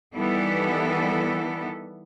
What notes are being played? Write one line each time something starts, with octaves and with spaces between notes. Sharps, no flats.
D#3 E3 G3 B3 E4 A4